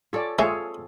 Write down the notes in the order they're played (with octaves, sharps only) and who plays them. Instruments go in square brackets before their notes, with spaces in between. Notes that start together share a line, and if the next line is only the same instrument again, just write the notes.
[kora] C#4 A4 [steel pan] F4 D5
[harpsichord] G#3 [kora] C4 A4 F5 [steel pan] F4 G#4 C#5 [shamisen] E5